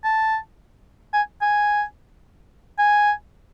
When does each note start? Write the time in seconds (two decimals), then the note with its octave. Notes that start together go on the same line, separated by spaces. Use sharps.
0.04 A5
1.13 G#5
1.42 G#5
2.79 G#5